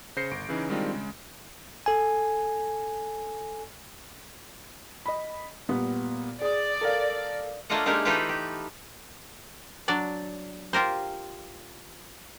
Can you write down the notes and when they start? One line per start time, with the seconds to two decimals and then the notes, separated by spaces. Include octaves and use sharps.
0.16 C#3 C5 G6 A#6 C7 C#7
0.31 G1 D7
0.49 C#3 E3 C#4 D#4
0.70 D#3 G3 G#3 C4 D4 F4
0.94 C#3 G#3
1.86 A4 G#5
5.06 D#5 B5
5.69 A#2 G3 B3
6.42 G#4 D5 D#6
6.81 A4 A#4 F5
7.70 A3 A#3 D4 F4 D#5 F#5
7.86 G#3 A#3 D4 D#4 G4 A#4
8.05 E3 A3 D#4 F4 G4 B4
8.29 G4
9.88 F#3 D4 D5
10.73 F4 G4 A#4 C5